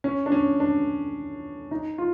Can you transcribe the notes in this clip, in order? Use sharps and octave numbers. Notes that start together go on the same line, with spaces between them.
C#4
D4
C#4
D4
D#4
F4